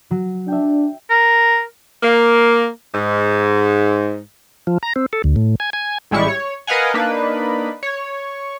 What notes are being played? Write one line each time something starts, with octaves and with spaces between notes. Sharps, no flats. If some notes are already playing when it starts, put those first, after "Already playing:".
F#3
D4 E5 G5
A#4
A#3
G#2
F3
A#5
C4
A4
D2
A2
G#5
G#5
A1 G3 G#3 E4 C#6
C#5
A#4 B4 D#5 F5 F#5 G#5
A#3 D4 D#4 B4
C#5